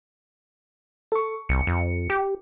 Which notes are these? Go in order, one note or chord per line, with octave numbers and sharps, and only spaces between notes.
A4 C#6
C2 C#7
F2
G4